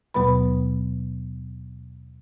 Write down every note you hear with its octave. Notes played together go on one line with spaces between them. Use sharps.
D#2 B2 F#3 B3 B4 B5